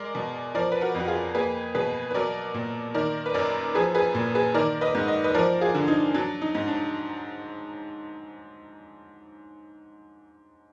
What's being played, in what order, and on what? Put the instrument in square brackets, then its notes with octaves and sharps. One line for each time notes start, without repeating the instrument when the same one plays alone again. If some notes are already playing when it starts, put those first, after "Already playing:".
Already playing: [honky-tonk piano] G#3 A#4 D5
B2
F3 A#4 D5
B4
F#4 A#4
F2 F#4
F4 G#4
A#3 G#4 B4
B2 G#4 B4
B4
F#3 A#4 D5
A#2
D#3 A#4 D5
B4
F#2 A#4 D5
F3 G#4 B4
G#4 B4
A#2
G#4 B4
D#3 A#4 D5
B4 D#5
G#2
D#5
B4 D#5
F3 A#4 D5
F4 G#4
D3
D#4
F#3 D4
D#4
G#2
D4